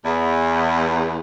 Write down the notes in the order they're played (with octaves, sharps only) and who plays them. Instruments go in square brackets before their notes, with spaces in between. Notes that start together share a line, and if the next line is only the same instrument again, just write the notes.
[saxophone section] E2